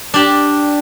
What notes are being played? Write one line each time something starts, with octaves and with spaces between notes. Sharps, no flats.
D4 G4